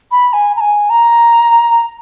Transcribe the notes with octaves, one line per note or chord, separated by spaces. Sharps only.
B5
G#5
A#5
G#5
A#5